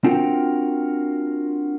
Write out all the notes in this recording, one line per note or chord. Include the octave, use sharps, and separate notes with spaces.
C4 D4 F4 F#4 A#4 G5